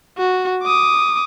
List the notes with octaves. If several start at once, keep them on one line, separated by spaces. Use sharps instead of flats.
F#4
D6 D#6